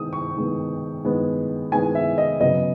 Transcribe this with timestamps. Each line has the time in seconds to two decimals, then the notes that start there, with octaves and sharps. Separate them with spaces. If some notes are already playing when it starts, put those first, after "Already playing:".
Already playing: D#3 G#3 B3 D#6
0.13 C#6
0.36 D#3 G#3 B3
1.04 D#3 G#3 B3
1.72 D#3 G#3 B3 G#5
1.95 E5
2.18 D#5
2.40 C#3 F#3 B3 D#5